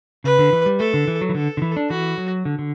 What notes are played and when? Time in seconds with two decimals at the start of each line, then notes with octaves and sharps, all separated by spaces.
0.24 C#3 B4
0.39 D3
0.53 E3
0.66 G3
0.79 A3 A4
0.94 D3
1.08 E3
1.21 F#3
1.29 E3
1.35 D3 A4
1.57 D3
1.62 E3
1.76 D4
1.90 E3 F#4
2.18 F#3
2.45 D3
2.59 D3